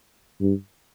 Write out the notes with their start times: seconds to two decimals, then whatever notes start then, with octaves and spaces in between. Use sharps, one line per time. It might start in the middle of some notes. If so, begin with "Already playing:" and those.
0.41 G2